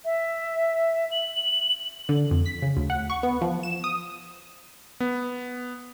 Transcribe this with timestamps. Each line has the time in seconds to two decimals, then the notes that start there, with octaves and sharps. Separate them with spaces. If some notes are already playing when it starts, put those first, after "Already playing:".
0.05 E5
1.11 F#7
2.09 D3
2.31 F2
2.46 B6
2.62 C#3
2.77 D2
2.90 F#5
3.10 C#6
3.23 B3
3.41 F3
3.63 E7
3.84 D#6
5.00 B3